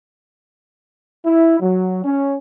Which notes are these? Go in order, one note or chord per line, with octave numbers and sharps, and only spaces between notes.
E4
F#3
C#4